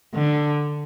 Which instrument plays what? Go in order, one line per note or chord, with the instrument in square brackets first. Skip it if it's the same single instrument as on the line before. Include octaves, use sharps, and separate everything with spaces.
[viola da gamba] D3